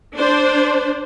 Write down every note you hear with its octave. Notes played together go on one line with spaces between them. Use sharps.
D4 C5